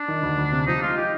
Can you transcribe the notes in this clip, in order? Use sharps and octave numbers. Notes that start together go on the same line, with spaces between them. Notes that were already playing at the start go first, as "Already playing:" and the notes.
Already playing: D4
D#3
D2
D2
C3
F3 D#4
G#3 F4
D#4 G4